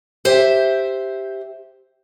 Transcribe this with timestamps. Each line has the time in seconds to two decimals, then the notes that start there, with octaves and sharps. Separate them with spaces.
0.25 G4 C5 E5